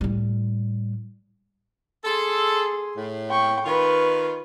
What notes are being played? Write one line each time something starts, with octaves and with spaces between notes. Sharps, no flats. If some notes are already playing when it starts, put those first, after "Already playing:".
A2 G3
G#4 A4 C6
A2
G5 C#6
D#3 F4 B4 C#6